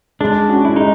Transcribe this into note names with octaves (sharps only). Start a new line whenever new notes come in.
G#3 D4
C#4 F#4
E4
G#3 D#4